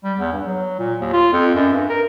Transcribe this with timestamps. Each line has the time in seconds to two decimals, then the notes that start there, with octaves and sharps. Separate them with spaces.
0.04 G3
0.19 E2
0.33 G2
0.46 F#3
0.79 A#2
1.01 D#2
1.13 F4
1.33 F2
1.55 F#2
1.73 G2
1.90 A#4